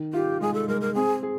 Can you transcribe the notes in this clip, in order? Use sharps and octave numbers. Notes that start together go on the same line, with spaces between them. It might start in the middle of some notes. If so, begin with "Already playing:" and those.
Already playing: D#3
F4 G4
G#3 G#4
A4
G#3 A#4
A#4
C4 G#4
G#4